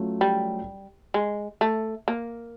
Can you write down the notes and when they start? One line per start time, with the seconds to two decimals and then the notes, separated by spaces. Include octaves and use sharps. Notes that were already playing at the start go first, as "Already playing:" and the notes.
Already playing: F#3 A3 C#4 F4
0.21 G3
1.14 G#3
1.61 A3
2.08 A#3